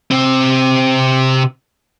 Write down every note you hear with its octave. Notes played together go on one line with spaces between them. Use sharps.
C3 C4